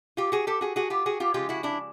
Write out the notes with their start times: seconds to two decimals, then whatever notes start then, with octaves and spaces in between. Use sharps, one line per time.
0.17 F4 G4
0.32 F#4 G#4
0.47 G4 A4
0.61 F#4 G#4
0.76 F#4 G#4
0.90 F4 G4
1.06 F#4 G#4
1.20 F4 G4
1.34 C#3 F3 G#3 F4 G4
1.49 E4 F#4
1.63 D4 E4